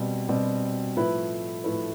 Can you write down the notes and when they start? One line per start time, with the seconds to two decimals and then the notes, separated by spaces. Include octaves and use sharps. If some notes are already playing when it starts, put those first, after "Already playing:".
Already playing: B2 G3 C4
0.29 B2 G3 C4
0.96 A2 F3 A3 E4 B4
1.64 A2 F3 A3 E4 B4